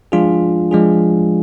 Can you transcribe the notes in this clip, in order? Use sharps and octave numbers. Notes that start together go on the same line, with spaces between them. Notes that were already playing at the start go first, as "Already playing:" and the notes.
F3 G#3 D4 F4 G#4
F3 G#3 D4 F4 G#4